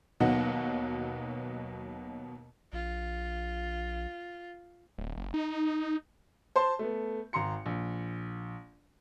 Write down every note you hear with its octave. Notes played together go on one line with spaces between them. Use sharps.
D#2 B2 F#3 B3 D#4 F#5
A#1 F4
D1
F#1
D#4
C5 A5 C6
A3 B3
G#1 A#5 C6 C#7
A#1